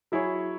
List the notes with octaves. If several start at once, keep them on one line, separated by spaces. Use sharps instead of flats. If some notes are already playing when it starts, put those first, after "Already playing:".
F#3 E4 G#4 C#5